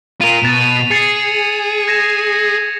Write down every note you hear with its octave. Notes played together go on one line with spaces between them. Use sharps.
F4 A#4 D#7 F7
B2 A6 E7
G#4 A6 C7 C#7
G#6 A#6 E7